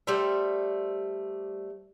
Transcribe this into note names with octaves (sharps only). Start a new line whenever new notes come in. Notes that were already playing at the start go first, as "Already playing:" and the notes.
G3 A3 C5 E5